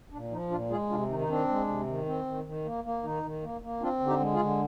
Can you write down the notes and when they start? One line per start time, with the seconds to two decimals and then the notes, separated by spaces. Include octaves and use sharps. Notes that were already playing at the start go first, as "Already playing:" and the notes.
0.12 A#2 D4
0.31 F3 D#4
0.50 A#2 D4 F4
0.70 G#3 F4 G#4
0.90 C3 D4 F4
1.09 D#3 D#4
1.20 D#4
1.29 C4 D4
1.49 G#3
1.68 C3
1.87 D#3
2.06 C4
2.25 D#3
2.45 D#3
2.65 A#3
2.84 A#3
3.03 D#3 D#4
3.23 D#3
3.42 A#3
3.61 A#3
3.81 C4 D4 F4
4.00 D3
4.07 D#4 G4
4.20 G#3
4.33 F4 G#4
4.40 D3